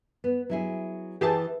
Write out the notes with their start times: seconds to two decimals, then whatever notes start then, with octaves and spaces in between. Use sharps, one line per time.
0.24 B3
0.49 F#3 E4 G#4
1.21 E3 G4 G#4 A5